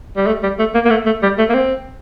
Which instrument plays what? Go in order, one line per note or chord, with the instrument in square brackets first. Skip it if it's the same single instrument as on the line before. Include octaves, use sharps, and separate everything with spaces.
[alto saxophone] G3
A3
G3
A3
A#3
A#3
A3
A3
G3
A3
A#3
C4